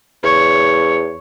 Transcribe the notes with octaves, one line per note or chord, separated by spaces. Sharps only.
E2 C#5